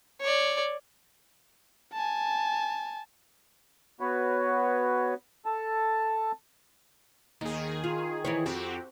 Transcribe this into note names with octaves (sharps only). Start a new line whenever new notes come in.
C#5 D5
G#5 A5
B3 F#4 B4 C#5
A4 A5
D#2 D#3 G#4
F4
E3 E4 C#5
F2 C4 F#4 G4